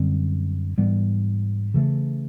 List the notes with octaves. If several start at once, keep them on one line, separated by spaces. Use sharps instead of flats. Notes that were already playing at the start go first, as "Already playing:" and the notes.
Already playing: F#2 D3 G3 C4
G#2 E3 G3 B3
C#3 E3 A3